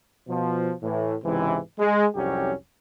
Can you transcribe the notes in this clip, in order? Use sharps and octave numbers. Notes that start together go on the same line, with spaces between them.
B2 F3
A2 E3
C#2 G#2 C3 E3
G#3
C2 F2 F#3 C#4 G4